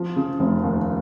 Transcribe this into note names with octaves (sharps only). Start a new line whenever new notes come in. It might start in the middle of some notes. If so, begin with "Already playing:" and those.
Already playing: F3
C#3
F1
D#2